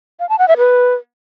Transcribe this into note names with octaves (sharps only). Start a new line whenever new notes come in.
F5
A5
F#5
E5
B4